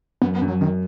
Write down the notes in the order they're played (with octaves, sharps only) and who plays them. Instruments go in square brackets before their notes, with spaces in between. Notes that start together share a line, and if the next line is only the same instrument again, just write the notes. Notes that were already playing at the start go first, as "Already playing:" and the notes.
[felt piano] F#2 [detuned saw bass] B3
[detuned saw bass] B3
[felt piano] F#2
[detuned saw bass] F#3
[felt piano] F#2 [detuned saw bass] D#3